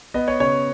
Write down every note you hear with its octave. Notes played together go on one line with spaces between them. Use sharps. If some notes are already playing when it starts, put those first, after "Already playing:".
B3 D#5
C#5
C#3 C#5